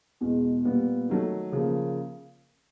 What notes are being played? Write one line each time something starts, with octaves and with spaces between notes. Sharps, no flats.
E2 B2 G#3
A#2 G3 B3
D#3 F#3 A3
C#3 F3 A#3